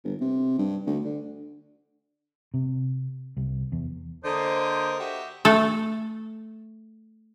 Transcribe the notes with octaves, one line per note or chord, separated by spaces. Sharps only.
G1
C3
G2
D2
D3
C3
C2
E2
D3 A#3 A#4 C5 D#5
F#4 G4 E5
A3 A4